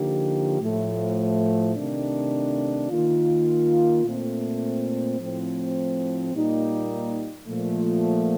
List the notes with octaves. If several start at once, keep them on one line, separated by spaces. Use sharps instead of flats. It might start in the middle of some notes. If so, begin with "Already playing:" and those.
Already playing: D3 F3 A#3 D#4 G4
A2 F3 A3
C3 D#3 A3 D4
D#3 A#3 F4
A#2 A3 C4
A2 F3 C4
A#2 G3 A#3 D#4 G4
A#2 F3 A3